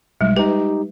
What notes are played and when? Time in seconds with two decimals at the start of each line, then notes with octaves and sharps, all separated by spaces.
0.21 B1 G3 G#3
0.36 D#4 G4 B4